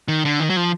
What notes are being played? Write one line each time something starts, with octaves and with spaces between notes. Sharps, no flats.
D#3
D3
D#3
F#3
F3